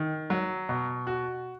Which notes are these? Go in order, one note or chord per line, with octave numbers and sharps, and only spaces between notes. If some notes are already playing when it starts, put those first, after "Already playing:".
Already playing: D#3
F#3
B2
F#4